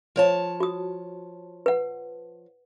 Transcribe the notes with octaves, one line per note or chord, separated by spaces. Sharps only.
F3 C#5 A5
F#4 D#6
B4 F#5